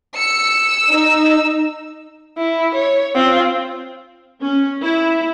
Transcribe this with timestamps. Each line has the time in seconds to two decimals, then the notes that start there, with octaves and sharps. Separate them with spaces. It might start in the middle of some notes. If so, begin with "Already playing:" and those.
0.17 E6 C#7
0.89 D#4
2.37 E4
2.75 C#5
3.15 C4 F4
4.41 C#4
4.83 E4